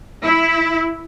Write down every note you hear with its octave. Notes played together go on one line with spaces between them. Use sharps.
E4